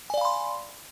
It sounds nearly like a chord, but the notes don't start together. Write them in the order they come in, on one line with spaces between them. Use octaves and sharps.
G#5 D5 F5 B5 C6